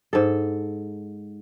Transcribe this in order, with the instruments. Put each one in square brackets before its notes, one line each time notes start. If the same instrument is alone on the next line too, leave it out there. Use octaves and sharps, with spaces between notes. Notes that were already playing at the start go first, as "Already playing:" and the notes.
[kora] G#2 A4